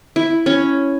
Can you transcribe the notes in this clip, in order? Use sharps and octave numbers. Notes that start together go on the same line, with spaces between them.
E4
C#4